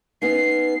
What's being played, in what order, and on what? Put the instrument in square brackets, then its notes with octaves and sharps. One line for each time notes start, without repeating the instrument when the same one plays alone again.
[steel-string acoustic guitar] B3 C#4 D#4 [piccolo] C7